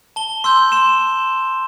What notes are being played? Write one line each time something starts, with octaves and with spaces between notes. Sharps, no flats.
A5 G7
C6 E6 G6
C6 E7